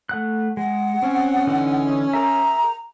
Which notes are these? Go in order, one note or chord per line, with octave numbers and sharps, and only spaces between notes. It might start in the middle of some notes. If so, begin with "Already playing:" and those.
A3 F#5 F#6
G#3 F#5
C4 C#4
D3 E3 D#4
G#4 A#4 E5 A#5